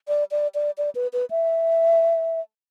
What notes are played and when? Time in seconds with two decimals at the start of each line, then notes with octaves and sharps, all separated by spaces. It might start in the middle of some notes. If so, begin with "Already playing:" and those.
0.08 D5
0.31 D5
0.55 D5
0.78 D5
0.95 B4
1.13 B4
1.30 E5